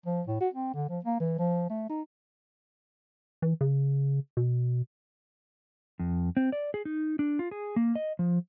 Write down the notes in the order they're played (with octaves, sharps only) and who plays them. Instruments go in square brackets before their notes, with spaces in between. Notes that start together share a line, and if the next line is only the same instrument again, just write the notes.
[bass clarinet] F3
A2
F#4
C4
D3
F3
A#3
E3
F3
A3
D#4
[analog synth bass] E3
C#3
B2
[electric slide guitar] F2
C4
D5
G#4
D#4
D4
F4
G#4
A#3
D#5
F3